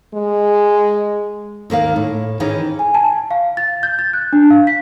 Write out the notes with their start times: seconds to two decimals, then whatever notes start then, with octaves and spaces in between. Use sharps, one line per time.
0.14 G#3
1.70 D#2 D#3 A#3 F5
1.96 A2
2.40 D#3 E3 C#4 D#4 G#4
2.79 G#5
2.94 A5
3.31 F5
3.57 A6
3.83 G6
3.99 A6
4.13 F#6
4.33 D4
4.50 F5
4.67 B6